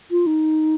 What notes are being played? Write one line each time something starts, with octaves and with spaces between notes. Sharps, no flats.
F4
D#4